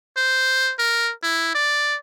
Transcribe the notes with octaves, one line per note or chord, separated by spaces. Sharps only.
C5
A#4
E4
D5